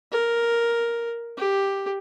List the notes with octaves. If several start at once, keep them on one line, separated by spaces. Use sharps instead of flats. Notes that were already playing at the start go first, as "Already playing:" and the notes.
A#4
G4